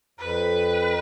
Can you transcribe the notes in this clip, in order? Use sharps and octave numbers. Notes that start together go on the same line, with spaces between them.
F2 B4